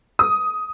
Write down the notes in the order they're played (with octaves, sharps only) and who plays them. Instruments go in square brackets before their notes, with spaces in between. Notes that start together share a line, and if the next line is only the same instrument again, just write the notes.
[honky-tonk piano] D#6